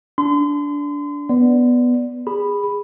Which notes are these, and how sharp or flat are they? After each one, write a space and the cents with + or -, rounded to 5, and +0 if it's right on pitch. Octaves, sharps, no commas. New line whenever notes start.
D4 -20 C6 -35
B3 +0 D5 -5
G#4 -25 B5 +0